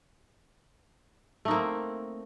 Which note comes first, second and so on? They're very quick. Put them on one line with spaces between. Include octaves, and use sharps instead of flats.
A3 D#4 A#3 C4